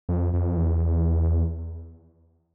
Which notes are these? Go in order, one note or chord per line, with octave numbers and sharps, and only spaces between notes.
F2
F2
E2